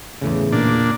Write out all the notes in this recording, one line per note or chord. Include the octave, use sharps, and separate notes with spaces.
E2 A2 C#3
A#2 D4